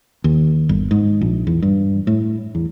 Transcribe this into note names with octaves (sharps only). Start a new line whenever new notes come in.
D#2
G1
G#2
A#1
E2
G2
A2
E2